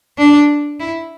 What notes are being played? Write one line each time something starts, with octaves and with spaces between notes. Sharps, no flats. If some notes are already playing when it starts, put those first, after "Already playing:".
D4
E4